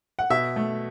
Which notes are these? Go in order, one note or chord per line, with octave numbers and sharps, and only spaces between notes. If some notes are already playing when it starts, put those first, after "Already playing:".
F#5
B2 E5
A3